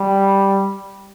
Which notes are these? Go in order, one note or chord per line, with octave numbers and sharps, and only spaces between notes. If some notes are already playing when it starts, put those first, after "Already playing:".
Already playing: G3